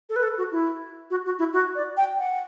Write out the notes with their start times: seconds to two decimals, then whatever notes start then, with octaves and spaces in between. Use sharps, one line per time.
0.09 A4
0.16 B4
0.23 A4
0.38 F#4
0.52 E4
1.10 F#4
1.25 F#4
1.39 E4
1.53 F#4
1.75 D5
1.97 G5
2.19 F#5